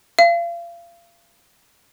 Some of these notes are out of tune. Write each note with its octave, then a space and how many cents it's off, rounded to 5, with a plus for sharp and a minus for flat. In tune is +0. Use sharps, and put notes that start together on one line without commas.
F5 -35